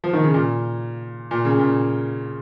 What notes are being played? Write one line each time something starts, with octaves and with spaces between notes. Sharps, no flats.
F3
D#3
C#3
A#2
A#2
C#3
A#2